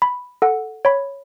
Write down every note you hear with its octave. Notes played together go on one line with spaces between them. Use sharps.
B5
A4 F#5
C#5 B5